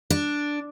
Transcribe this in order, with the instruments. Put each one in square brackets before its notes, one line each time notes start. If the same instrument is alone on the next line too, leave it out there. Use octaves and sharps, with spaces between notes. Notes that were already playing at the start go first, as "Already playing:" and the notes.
[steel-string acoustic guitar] D4